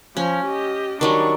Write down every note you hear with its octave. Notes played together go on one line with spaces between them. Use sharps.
F3 C#4
G4 D#5
D#3 F#3 G3 D4 C#6